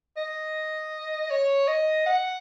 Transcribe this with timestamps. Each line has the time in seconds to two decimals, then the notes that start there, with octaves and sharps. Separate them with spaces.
0.17 D#5
1.31 C#5
1.68 D#5
2.06 F#5